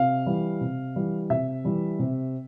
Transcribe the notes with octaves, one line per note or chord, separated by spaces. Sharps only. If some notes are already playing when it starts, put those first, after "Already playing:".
Already playing: C3 F5
E3 G3
C3
E3 G3
C3 E5
E3 G3
C3